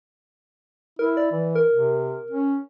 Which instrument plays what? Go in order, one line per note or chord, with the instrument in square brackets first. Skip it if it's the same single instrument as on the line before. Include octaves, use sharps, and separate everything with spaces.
[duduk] E4 [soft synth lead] A#4
[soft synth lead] D5
[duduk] E3
[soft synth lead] A#4
[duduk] C3
C#4